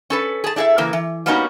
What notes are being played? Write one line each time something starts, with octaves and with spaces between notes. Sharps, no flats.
C#4 A4 B4
G#4 A5
D4 E4 G#4 A4 E5
C#3 E3 A#3
E3
G3 A#3 B3 C#4 D#4 F#4